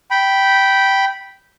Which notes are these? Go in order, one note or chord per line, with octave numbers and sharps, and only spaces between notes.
G5 B5